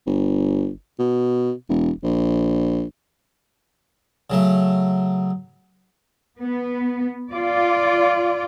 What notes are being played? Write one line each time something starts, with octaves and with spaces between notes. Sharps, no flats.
G1
B2
E1
A#1
C#3 F#3 A3
B3
F4 D5